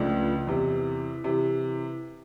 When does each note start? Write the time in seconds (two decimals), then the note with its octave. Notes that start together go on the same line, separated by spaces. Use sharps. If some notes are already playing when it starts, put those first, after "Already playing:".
Already playing: C#2 C#3 F3 A3 D4
0.47 E2 C3 E3
1.24 C3 E3